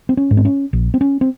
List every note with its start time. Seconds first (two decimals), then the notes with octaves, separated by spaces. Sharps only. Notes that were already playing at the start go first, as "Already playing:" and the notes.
0.09 C4
0.17 C#4
0.31 G#2
0.37 C4
0.45 C#4
0.73 A#1
0.94 C4
1.01 C#4
1.21 C4